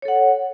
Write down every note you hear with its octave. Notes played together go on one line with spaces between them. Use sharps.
A4 C#5 F#5